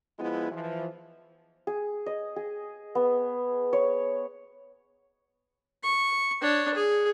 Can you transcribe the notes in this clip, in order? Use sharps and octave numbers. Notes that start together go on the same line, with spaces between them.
F3 G#3 B3 E4
E3 F3
G#4
D#5
G#4
B3
C#5
C#6
D4 C#5
G#4